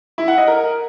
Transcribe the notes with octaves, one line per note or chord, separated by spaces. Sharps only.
E4
F#5
D#5
A#4